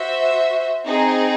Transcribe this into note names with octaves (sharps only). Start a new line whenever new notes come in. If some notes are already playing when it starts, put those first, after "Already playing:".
Already playing: F#4 C5 E5
C4 D#4 G#4